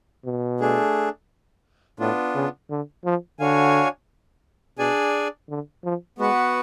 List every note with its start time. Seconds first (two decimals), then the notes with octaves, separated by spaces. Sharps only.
0.25 B2
0.60 A3 D4 G#4
1.99 A2 B3 D4 F4
2.35 C#3
2.70 D3
3.05 F3
3.39 D3 D4 F#4 C#5 F5 G#5
4.78 B2 D4 G#4 D5 G#5
5.49 D3
5.84 F3
6.18 G#3 B3 F#4 B4 F#5